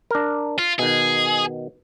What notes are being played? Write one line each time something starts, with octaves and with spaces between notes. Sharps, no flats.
D4 A#4
F4
B2 D#3 G#4